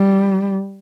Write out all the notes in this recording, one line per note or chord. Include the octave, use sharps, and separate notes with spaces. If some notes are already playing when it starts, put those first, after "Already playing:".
Already playing: G3